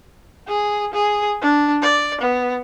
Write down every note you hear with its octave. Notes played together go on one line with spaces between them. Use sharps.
G#4
G#4
D4
D5
B3